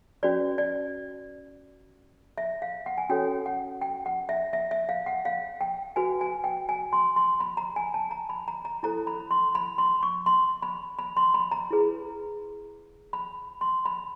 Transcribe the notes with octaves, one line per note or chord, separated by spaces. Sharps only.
C#4 F#4 B4 D5
D5
E5
F5
F#5
G#5
C#4 F#4 A4 C#5 G5
F#5
G5
F#5
E5
E5
E5
F5
F#5
F5
G5
F#4 B4 G#5
G#5
G5
G#5
C6
C6
B5
A#5
G#5
A5
A#5
B5
A#5
A#5
E4 A4 C5 A#5
B5
C6
B5
C6
C#6
C6
B5
B5
C6
B5
A#5
E4 G#4 B4
B5
C6
B5